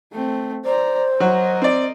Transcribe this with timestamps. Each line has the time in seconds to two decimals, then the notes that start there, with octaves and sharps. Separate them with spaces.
0.12 A3 C4
0.65 C5 D5 A#5
1.20 F#3 F#4 A#4 D#5
1.62 C4 D5